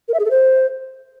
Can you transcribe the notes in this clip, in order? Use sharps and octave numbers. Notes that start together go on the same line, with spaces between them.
A#4
E5
G#4
A4
C5